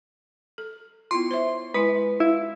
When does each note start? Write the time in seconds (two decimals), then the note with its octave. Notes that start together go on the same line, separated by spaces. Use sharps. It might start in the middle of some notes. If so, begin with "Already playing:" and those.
0.58 A4
1.11 B3 E4 F4 C6
1.31 C5 C#5 E5
1.74 G#3 E4 B4 G#5
2.20 E4 F5